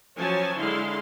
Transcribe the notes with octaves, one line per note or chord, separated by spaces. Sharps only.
F3 F#3 C#4 C#5 G#5 A5
D3 G#3 E4 F5 C6